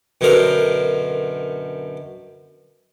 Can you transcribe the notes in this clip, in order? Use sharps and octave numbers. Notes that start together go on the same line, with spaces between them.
F#2 B2 D3 A#4 C5